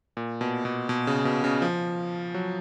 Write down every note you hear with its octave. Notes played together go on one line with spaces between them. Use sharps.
A#2
B2
B2
B2
C#3
B2
C#3
F3
F#3